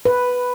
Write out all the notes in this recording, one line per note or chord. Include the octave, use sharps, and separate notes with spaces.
B4